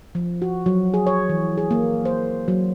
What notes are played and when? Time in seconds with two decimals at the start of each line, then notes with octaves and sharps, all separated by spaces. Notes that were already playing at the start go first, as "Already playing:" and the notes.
0.15 F3
0.42 F#4
0.66 F#3
0.94 G#4
1.07 C#5
1.29 E3
1.58 G#4
1.71 A#3
2.05 C5
2.48 F#3